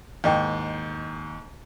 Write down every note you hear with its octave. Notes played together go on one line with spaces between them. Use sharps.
D#2 G#2 E4 D#5 G5